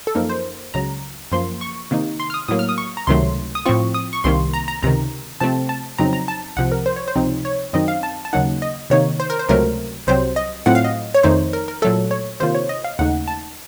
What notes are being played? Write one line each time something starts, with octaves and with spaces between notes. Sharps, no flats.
A4
F#2 F3 A#3 D#4 A#4
C5
C#2 C#3 F#3 A#5
F#2 F3 A#3 C6
C#6
C3 D#3 A#3 D#4
C6
F6
D#6
A2 F#3 A#3 D#6
F6
D#6
C#6
A#5
C#2 C3 D#3 F#3 A3 C6
D#6
A2 F3 C4 F4 C#6
D#6
C#6
C2 C3 D#3 A#3 C6
A#5
A#5
C#2 C3 D#3 A#5
C3 F3 A3 C4 A5
A5
F2 C#3 F#3 C4 D#4 A#5
A#5
A5
C2 C3 F3 F#5
A#4
C5
C#5
C5
C#2 C3 F3 C4 D#4
C#5
F#2 D#3 F#3 C4 D#4 D#5
F5
A5
A5
D#2 C#3 F#3 A#3 D#4 F#5
D#5
C3 D#3 A#3 D#4 C#5
C5
A#4
C5
C#2 C3 F#3 A3 A#4
C2 C3 F#3 C4 C5
D#5
A2 F#3 A3 C4 F4 F#5
F5
D#5
C#5
F2 D#3 A3 D#4 C5
A#4
A#4
A#2 F#3 A3 A4
C#5
C3 D#3 A#3 F4 C5
C#5
D#5
F5
D#2 C#3 A3 D#4 F#5
A5